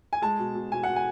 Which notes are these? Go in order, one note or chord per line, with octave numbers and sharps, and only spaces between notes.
G#5
G#3 A5
B2
B2
B2 G#5
F#5
B2
G#5